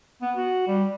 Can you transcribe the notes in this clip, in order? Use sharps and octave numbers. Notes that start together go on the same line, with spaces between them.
B3
F#4
G3